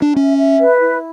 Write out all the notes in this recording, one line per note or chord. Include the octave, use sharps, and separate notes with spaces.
D4
C#4 E5
E5
B4
E4